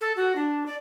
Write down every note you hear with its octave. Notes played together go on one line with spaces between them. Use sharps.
A4
F#4
D4
D5